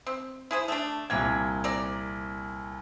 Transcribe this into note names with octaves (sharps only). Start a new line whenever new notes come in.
C4
E4 G#4 C5
A3 D4
C2 A#2 A#3 G5 G#6
C4 A#4 D5